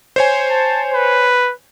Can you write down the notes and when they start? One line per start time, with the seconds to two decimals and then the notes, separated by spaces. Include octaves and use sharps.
0.16 C5 C#5 G#5
0.50 A5
0.94 B4